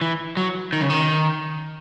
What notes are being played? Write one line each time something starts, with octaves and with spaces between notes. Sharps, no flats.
E3
F#3
D#3
C#3
D#3